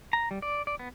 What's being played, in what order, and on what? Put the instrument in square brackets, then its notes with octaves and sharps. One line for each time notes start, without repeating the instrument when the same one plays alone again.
[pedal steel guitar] A#5
G3
D5
D5
B3